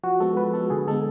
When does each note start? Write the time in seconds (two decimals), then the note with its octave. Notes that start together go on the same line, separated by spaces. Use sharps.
0.03 F3 F#4
0.20 G#3 B3 A4
0.37 F3 B4
0.53 G#3 B3 A4
0.70 D3 G#4
0.88 G#3 B3 A4